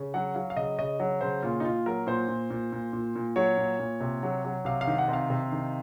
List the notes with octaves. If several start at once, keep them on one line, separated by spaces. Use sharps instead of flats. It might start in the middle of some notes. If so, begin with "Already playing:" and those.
Already playing: C#3
F#3 F#5
F#3 F5
F5
C#3 D#5
C#3 D#5
F#3
C#3 C5
A#2 F4
D#4
A#2 F4
F#3 A#4
A#2 C5
A#2
A#2
A#2
A#2
A#2
F#3 C#5
A#2
A#2
C3
F#3
F#3
C3 F5
F5
D#3
F#5
C3
F5
C3
D#3